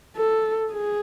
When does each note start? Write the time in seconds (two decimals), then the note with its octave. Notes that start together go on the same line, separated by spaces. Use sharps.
0.16 A4
0.72 G#4